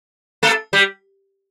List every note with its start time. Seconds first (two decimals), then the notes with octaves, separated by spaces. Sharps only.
0.43 A3 A4
0.73 G3 G4